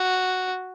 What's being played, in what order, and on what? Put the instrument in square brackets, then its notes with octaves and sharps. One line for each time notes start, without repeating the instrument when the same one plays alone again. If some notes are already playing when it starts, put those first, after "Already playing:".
Already playing: [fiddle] F#4